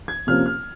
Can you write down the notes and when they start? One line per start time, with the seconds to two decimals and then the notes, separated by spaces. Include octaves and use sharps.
0.08 G#6
0.27 C3 F3 A#3 C#4 F6
0.46 F6